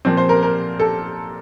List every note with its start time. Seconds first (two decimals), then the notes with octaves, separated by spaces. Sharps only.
0.05 A#2 F3 C4
0.17 C5
0.29 A#4
0.43 A#4
0.79 A4